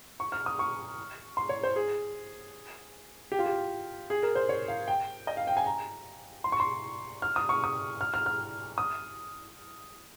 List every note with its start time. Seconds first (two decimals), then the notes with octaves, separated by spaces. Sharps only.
0.20 C#6
0.32 F6
0.46 D#6
0.59 C#6
1.37 C6
1.49 C#5
1.63 C5
1.76 G#4
3.32 G4
3.39 F4
3.46 G4
4.10 G#4
4.23 A#4
4.35 C5
4.49 C#5
4.68 F5
4.88 G5
5.27 D#5
5.37 F5
5.47 G5
5.57 G#5
5.66 A#5
6.44 C6
6.52 C#6
6.60 C6
7.22 F6
7.36 D#6
7.49 C#6
7.64 D#6
8.01 F6
8.14 F6
8.26 F6
8.78 D#6